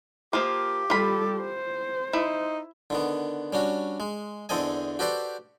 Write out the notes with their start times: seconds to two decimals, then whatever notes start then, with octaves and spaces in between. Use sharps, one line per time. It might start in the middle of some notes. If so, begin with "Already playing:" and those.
0.33 F3 A#3 F4 G4
0.90 G3 F4 A4 B5
1.39 C5
2.13 D#4 E4
2.90 D3 D#3 B3
3.53 G3 C#4 D4 F#4
4.00 G#3
4.49 E2 D3 C4 A4 D#5 G#5
4.99 F#4 G4 A4 B4 C5 D5